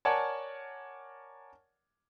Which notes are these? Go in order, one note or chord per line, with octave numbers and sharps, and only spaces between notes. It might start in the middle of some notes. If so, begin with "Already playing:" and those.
A#4 C#5 D5 F#5 G#5 A5